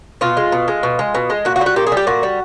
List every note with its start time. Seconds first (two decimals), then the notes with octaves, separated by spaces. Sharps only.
0.21 B2 F4
0.37 G#3
0.52 B2
0.68 G#3
0.83 B2
0.99 G#3
1.15 B2
1.30 G#3
1.45 A#2 F#4
1.56 F#4
1.61 G3
1.66 F#4
1.76 A#2 G4
1.87 G#4
1.92 G3 G4
2.07 A#2 F#4
2.23 G3